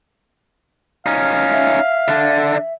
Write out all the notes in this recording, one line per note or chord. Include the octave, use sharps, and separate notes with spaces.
C#4 D#4 F5
E5
D3 D4